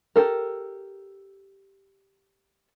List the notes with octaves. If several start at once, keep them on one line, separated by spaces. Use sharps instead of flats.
G4 A4 A#4